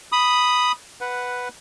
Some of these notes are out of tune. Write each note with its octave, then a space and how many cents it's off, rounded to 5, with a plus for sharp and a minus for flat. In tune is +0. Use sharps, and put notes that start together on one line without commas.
B5 +0 D#6 +0
B4 +0 F#5 -5